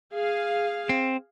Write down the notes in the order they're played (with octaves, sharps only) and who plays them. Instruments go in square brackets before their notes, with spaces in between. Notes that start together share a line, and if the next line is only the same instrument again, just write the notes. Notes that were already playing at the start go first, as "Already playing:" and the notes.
[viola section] G#4 F5
[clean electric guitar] C4